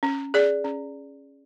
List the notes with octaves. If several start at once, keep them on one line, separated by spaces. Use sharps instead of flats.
C#4
G#4 D5
C#4